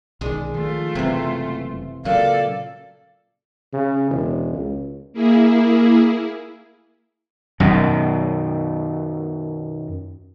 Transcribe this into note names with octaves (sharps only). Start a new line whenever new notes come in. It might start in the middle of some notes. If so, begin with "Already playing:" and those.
B1 D#3 G#3 D4
D#3 F3 A3 F4
F#1 C3 E3
A#2 C#3 F#3 A4 D5 F5
C#3
E1
C#2
A#3 E4 G#4
F#2 B2 D#3